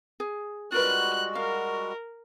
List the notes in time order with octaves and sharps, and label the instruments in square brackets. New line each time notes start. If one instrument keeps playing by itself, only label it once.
[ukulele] G#4
[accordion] G3 G#3 F#4 [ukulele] F4 A#4 B4 [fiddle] F#6
[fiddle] A#4 [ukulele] F5